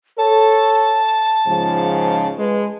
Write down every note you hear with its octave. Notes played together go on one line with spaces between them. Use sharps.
A4 C#5 A5
G#2 C#3 F3
G#3 B4